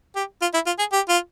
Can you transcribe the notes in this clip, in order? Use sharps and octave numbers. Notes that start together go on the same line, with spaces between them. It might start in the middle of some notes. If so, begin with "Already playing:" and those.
G4
F4
E4
F4
G#4
G4
F4